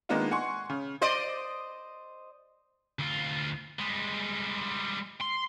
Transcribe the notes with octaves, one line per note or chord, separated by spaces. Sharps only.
D#3 G#3 A#3 B3 D4 F4
F#5 G#5 C6 C#6
C#3
C5 D5 D#5
D2 F4
G3 G#3
C6